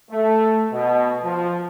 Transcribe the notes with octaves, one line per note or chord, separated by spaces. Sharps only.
A3
B2
F3